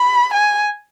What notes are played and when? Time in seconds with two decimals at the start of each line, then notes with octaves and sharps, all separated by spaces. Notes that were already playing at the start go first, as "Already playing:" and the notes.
Already playing: B5
0.34 G#5